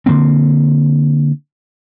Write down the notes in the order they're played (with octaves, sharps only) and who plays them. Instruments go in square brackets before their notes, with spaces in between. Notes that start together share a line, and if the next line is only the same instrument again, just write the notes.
[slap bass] D3 F3 A#3 C4